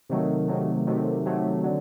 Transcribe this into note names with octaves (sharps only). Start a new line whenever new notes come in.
C3 D#3 F#3 A3
C3 D#3 F#3 A3
C3 D#3 F#3 A3
C3 D#3 F#3 A3
D3 F#3